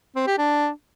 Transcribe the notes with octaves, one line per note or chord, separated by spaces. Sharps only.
C4
G4
D4